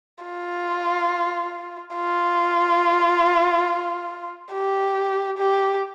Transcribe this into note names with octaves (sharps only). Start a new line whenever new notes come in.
F4
F4
G4
G4